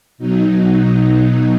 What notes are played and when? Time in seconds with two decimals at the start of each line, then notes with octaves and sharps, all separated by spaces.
0.18 B2 F#3 D#4